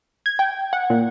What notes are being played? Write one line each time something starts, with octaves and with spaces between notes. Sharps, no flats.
G#6
G5
F#5
A#2